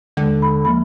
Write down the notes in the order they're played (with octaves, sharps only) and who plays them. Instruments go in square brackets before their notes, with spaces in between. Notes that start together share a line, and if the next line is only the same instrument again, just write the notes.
[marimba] D#2 G#3 [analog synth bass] D3
[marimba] B5
F3 A#3 B5